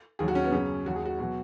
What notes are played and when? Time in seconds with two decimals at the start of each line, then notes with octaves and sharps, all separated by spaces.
0.19 D#2 D#3 F#3 G#4
0.28 F#4
0.35 C#4
0.44 B3
0.52 F#2 C#3 F#3 C#4
0.86 D#2 D#3 F#3 F#4
0.96 G#4
1.05 F#4
1.19 B2 F#3 F#4